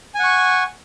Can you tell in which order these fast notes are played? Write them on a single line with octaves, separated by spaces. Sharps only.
G#5 F#5 C#6